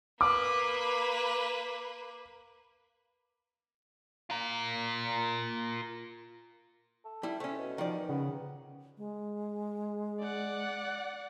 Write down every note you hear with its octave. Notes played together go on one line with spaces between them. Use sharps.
A#3 B4 D6
F4 A#4
A4
G3 E4
A3 C4 C#4
B2
D#3 F3 D5
C#3 B3
G#3
D5 F#5